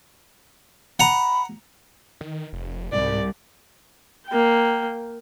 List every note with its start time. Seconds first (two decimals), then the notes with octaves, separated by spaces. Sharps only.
1.00 F#5 A#5 B5
2.21 D#3
2.53 F1
2.93 C2 G#2 D5
4.27 A#3 G5